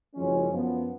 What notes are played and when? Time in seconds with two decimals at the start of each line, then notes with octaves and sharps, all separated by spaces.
0.15 F#1 F#2 F3 G#3 C#4
0.50 F#2 F3 B3